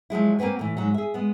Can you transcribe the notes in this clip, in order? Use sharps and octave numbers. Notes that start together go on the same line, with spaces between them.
F3 F#3 G#3 E4
A#3 C4 F#4 B4 G#5
A2 E3
G#2 F#3
G#4 E5
G#3 B3